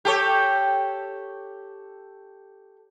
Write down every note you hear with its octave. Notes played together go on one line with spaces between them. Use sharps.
G4 A4 C#5